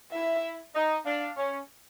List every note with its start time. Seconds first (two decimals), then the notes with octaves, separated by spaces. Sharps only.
0.12 E4 E5
0.75 D#4
1.05 D4 F5
1.37 C#4